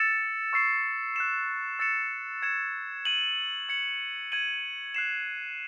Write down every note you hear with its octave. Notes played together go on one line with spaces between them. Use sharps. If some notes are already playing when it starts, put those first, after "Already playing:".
Already playing: E6 A6 C#7 E7
C#6 E6 C7 E7
F#6 C7 E7
E6 A6 C#7 E7
G#6 C#7 E7
G#6 D#7 F#7
G#6 C#7 F#7
G#6 D#7 F#7
F#6 C7 E7